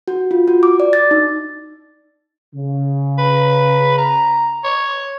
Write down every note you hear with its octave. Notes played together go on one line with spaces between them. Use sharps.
F#4
F4
F#4
D6
D5
A6
D#4
C#3
B4
A#5
C#5